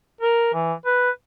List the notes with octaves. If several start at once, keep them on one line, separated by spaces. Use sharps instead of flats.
A#4
E3
B4